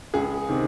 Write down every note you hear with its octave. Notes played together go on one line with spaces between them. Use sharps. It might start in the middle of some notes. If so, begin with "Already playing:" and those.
C#2 G#4
C3 D#3 C4